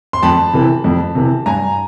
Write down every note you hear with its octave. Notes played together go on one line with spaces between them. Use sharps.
C6
F2 A5 B5
C3 E3
F2
C3 E3
G2 G#5 A#5